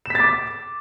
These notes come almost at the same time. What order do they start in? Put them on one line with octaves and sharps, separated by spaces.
E7 B6 A6 D6